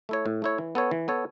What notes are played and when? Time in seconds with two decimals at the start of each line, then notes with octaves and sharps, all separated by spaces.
0.09 A3 E4 C#5
0.26 A2
0.42 A3 E4 C#5
0.58 E3
0.75 B3 A4 C#5
0.91 E3
1.08 B3 A4 C#5